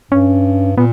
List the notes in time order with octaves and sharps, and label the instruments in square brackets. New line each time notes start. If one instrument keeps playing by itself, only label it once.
[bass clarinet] G2 [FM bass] C#4
[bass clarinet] A#2 [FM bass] B3